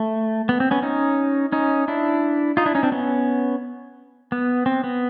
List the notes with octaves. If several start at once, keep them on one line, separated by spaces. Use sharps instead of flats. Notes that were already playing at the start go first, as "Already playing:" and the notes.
Already playing: A3
B3
C4
B3 C#4
C#4 D#4
C#4 D#4
D4 E4
D#4 F4
D4 E4
C#4 D#4
C4 D4
B3 C#4
B3
C4
B3